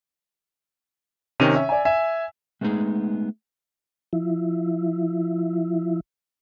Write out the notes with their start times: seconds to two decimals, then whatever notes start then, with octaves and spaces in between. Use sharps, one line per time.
1.40 C3 D#3 C#4 D#7 F7
1.56 E5
1.69 D5 G#5
1.85 E5 G#5
2.61 G#3 A3 B3 C#4 D#4 G#4
4.13 F3 E4